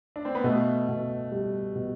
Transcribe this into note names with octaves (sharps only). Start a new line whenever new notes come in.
D4
C4
B3
B2 A3
B2
G3
B2